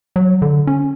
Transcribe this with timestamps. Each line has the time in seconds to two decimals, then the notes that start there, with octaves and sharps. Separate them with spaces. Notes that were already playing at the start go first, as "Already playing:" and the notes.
0.16 F#3
0.42 D3
0.67 C#4